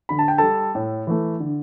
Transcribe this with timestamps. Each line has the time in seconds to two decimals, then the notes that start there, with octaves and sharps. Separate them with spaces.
0.09 D3 B5
0.19 A5
0.28 G5
0.38 G3 A4 A5
0.75 A2
1.07 E3 A3
1.40 D3